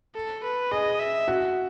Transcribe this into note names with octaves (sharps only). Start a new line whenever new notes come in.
A4
B4
G#4 D#5
E5
F#4